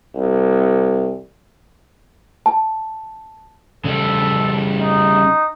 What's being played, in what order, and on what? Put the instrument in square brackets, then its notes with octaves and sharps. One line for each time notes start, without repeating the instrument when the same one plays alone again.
[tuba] C2
[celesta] A5
[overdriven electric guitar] C#3 G3 [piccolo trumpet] A4
[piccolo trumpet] D#4